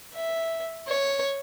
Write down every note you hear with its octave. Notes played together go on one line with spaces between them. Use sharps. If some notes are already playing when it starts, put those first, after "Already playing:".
E5
C#5